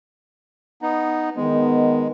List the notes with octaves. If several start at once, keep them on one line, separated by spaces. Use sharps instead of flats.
B3 D#4
D#3 G#3 B3